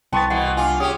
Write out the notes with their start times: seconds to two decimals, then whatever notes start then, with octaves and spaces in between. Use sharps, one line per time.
0.13 C2 B3 G5 A5 C6 C#6 A6
0.30 B2 E3 F#5
0.57 D4 F4 D6
0.80 C#4 G4 G#4 D#6